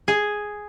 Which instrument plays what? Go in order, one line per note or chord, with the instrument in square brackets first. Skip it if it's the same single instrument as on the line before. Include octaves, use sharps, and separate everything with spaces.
[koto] G#4